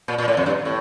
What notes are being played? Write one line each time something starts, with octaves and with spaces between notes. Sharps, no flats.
A#2
A#2
A2
F2
G2
A2